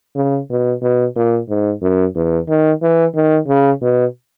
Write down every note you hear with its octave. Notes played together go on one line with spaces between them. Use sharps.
C#3
B2
B2
A#2
G#2
F#2
E2
D#3
E3
D#3
C#3
B2